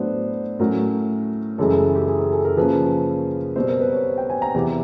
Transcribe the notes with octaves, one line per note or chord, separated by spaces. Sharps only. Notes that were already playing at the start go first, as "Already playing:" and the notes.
Already playing: A2 F#3 B3 D4 C5
A2 F#3 A3 C#4 A#4
F#2 C#3 E3 G#3 A4
A4
G4
G#4
G#4
A4
A#4
C#3 F3 A#3 C#4 B4
B2 G3 C4 C5
A#4
B4
C#5
G5
G#5
A#5
E2 C3 E3